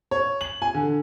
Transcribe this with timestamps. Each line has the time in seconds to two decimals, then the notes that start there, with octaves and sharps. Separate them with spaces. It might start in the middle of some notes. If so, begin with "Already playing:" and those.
0.11 C#5
0.41 F#7
0.62 G#5
0.74 D3